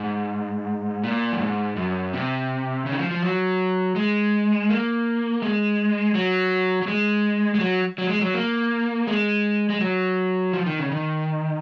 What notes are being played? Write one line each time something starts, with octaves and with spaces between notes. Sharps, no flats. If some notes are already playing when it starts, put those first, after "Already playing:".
Already playing: G#2
A#2
F#2
G#2
F#2
C3
C#3
D#3
F3
F3
F#3
G#3
A#3
G#3
F#3
F#3
G#3
G#3
F#3
F#3
G#3
F#3
A#3
G#3
G#3
F#3
F3
D#3
C#3
D#3